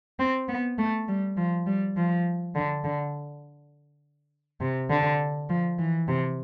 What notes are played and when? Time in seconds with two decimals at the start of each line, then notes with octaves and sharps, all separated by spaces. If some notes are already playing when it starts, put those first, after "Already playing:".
0.19 C4
0.48 B3
0.78 A3
1.08 G3
1.37 F3
1.66 G3
1.96 F3
2.55 D3
2.84 D3
4.61 C3
4.90 D3
5.49 F3
5.79 E3
6.08 C3